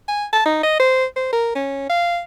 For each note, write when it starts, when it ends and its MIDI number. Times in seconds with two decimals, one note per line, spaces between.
0.08 0.25 80
0.33 0.45 81
0.45 0.59 63
0.63 0.78 75
0.80 1.05 72
1.16 1.30 72
1.32 1.50 70
1.55 1.85 61
1.90 2.21 77